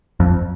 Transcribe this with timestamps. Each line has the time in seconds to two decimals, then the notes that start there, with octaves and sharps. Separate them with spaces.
0.20 F2